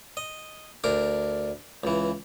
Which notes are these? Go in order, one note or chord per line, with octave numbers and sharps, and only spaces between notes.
D#5
D2 D4 A#4 A#5
C#2 E3